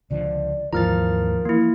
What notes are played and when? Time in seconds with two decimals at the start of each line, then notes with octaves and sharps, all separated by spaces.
0.11 C#2 D3 F3 D5
0.73 D#2 G#2 E3 F3 A#4 A#5 F6 A6
1.45 E3 A#3 E4